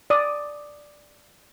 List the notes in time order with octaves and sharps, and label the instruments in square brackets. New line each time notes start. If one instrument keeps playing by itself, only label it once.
[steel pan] D5 D#6